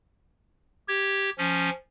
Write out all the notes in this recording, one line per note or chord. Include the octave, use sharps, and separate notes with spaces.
G4 G#6
F3 C#4